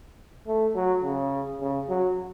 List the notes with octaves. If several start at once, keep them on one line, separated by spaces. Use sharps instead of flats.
A3
F#3
C#3
C#3
F#3